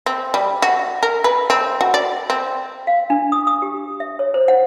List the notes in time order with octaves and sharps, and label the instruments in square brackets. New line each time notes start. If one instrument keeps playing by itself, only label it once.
[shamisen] C4
G3
F#4
A#4
B4
C4
F#4
D5
C4
[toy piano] F5
D4
D#6
D#6
G4
E5
C#5
C5
F#5